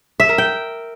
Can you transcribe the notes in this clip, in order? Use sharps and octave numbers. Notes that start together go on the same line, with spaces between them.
E5
A#4
G5